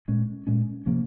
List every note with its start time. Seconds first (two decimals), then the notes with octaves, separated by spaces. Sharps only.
0.08 A#2 G#3 C#4
0.47 A#2 G#3 C#4
0.86 C3 F3 A#3 C#4